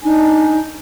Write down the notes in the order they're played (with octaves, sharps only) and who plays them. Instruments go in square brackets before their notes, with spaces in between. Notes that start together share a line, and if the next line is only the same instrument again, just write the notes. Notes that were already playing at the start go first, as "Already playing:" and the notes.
[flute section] D4 D#4 G#5